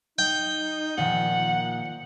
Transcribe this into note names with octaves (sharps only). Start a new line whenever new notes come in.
D#4 G5
A#2 D#3 F3 F#5